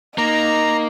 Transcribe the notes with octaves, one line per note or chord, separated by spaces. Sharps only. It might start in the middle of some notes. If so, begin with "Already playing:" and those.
A#3 D#4 A#5